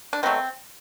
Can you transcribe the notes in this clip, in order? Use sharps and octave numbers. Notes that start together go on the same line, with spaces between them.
D4
B2 F#3 A3 C4